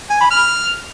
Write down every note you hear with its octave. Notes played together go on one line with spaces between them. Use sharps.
G#5
B5
F6